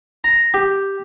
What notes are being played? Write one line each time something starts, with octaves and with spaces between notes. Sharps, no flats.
A#5
G4